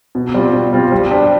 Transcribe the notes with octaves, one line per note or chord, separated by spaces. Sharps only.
B2
G3 C4 F4
B2
G3 C4 F4
G3
D4 G4 C5